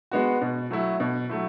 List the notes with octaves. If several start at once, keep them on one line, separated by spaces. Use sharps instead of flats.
G#3 B3 F#4
B2
F#3 A3 E4
B2
F#3 A3 E4